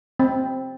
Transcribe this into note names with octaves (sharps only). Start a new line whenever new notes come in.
C4